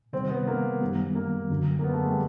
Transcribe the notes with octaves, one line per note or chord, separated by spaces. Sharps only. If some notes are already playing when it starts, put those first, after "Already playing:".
C3 D#3 G3 C4
B3
A#3
F#2 D#3 G3 B3
A#3
F#2 D3 F#3
A#3
B3
A3
G#3
G3